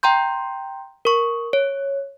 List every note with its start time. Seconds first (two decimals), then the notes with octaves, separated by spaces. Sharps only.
0.03 G5 A#5 C6 G6
1.05 A#4 C#6
1.53 C#5